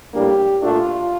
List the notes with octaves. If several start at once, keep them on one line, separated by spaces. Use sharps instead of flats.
A2 G3 A#3 D4 G4
A#2 A3 D4 F4